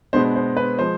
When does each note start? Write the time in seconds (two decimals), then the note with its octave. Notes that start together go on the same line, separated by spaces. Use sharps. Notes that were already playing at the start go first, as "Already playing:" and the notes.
0.13 B2 G#3 B3 D4 C5
0.36 C5
0.57 B4
0.79 F3 G#3 C5